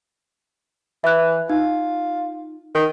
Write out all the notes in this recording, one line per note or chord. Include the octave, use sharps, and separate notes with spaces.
E3 E5 F#6
D#4 F4
D#3